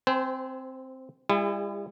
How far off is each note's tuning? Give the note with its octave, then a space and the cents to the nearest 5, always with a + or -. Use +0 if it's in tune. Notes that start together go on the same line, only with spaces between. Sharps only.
C4 +0 C5 -30 G#5 +25
G3 +45 E4 +40 G#4 -30